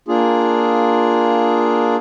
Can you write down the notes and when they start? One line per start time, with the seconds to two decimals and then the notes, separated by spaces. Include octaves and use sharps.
0.08 A#3 D4 F4 G#4